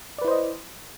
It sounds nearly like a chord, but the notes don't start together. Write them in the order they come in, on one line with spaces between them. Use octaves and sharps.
D5 B4 E4 C5 D#5